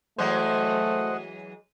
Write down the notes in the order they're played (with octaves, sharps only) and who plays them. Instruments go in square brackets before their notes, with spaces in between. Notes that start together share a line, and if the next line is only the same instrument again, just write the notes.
[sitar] E3 F#3 G#3 [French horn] A3 [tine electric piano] C5 [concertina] D#5 F#5